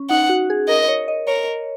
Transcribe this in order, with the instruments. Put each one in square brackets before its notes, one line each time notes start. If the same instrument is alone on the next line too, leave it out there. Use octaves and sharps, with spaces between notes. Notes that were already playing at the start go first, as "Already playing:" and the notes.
Already playing: [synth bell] C#4
[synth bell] D#4 [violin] F#5
[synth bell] F#4
G#4
[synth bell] A#4 [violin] D#5
[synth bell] C#5
D#5
[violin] A#4 [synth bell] C#5